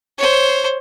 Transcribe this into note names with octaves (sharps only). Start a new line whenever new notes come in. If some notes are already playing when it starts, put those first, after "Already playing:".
C5 C#5